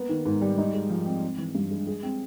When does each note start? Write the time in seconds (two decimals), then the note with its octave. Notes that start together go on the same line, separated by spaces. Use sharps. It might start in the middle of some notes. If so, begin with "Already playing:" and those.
Already playing: A#3 B3
0.09 D#3
0.26 G#2
0.41 G3
0.58 D#4
0.74 G#3
0.90 F3
1.06 C4
1.22 C4
1.38 E3
1.55 G2
1.71 G#3
1.87 G#4
2.03 C4